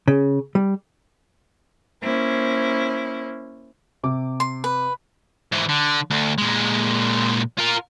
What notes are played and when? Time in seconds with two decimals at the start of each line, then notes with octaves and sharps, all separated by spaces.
0.08 C#3
0.55 G3
2.03 A#3 C#4 E4 C5
4.03 C3 D6
4.40 C6
4.64 B4
5.52 G#2 E3
5.69 D3
6.10 D2
6.38 A#2 G#3
7.59 F4 A#4